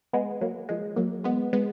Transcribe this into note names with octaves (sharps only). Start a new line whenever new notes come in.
G#3 B3
F#3 A#3
F3 G#3
F#3 A#3
G#3 B3
G#3 B3